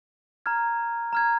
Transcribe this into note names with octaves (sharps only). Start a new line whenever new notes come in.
A#5 F6 G#6
A#5 F6 G#6